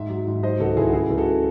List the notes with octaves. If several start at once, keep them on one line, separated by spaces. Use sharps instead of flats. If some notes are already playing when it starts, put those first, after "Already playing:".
Already playing: G#2 E5
F#3
G#2
F#3 C5 D#5
C#2 F#4 A4
C#2 E4 G#4
F#4
C#3 E4 G#4
C#2
F#4 A4